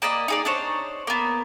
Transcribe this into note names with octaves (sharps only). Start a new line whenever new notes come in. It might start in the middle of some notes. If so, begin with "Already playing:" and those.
A#3 D5 D#5 B5
D#4 G#4 D5
D4 D#4 C5 C#5
A#3 B3